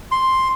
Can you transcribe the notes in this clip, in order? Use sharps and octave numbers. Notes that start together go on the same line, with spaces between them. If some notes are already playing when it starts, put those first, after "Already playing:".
C6